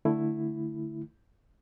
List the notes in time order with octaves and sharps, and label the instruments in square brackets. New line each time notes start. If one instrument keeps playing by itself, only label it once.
[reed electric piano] D3 A3 E4